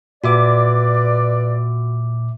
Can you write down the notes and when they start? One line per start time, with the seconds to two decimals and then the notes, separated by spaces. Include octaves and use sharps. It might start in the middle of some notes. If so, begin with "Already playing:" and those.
0.24 A#2 F#4 B4 D5 E5 D6